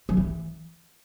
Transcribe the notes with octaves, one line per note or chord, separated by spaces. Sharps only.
F3
E3